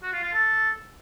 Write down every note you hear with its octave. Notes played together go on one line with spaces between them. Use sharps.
F#4
F4
F4
A4